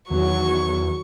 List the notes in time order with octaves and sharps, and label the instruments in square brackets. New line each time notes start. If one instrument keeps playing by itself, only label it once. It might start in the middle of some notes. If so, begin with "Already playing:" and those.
[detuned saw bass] E2 [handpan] D#3 F#4 [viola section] F#3 [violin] C#6